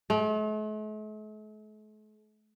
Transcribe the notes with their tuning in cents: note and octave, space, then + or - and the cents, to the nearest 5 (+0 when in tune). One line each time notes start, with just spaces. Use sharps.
A3 -45